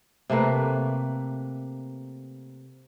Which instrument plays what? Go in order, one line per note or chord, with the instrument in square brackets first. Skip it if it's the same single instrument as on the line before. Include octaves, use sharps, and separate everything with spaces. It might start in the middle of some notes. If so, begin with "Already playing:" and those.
[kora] C3 A3 A#3 B4